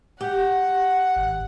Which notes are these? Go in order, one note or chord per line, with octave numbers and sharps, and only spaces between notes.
G4 F#5
G#1